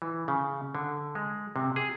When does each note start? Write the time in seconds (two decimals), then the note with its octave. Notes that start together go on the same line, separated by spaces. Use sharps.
0.02 E3
0.28 C#3
0.75 D3
1.15 G#3
1.56 C3
1.76 G#4